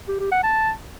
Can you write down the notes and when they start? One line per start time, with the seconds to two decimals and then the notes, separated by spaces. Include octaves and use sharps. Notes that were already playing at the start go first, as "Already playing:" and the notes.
0.08 G4
0.20 G4
0.32 F#5
0.43 A5